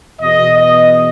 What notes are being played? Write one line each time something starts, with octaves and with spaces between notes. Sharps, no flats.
E2 B2 D#5
D#5